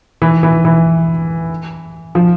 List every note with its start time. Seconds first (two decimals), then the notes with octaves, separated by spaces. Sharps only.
0.22 E3
0.43 E3
0.65 E3
2.15 F3